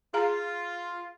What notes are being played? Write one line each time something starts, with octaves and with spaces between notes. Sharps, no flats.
F4 G#4 F5 A#5